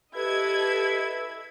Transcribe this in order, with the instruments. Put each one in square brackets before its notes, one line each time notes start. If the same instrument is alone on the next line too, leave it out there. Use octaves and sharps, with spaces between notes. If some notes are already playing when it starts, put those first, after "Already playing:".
[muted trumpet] E4 [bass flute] G4 [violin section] A4 D#5 G#6 [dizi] B4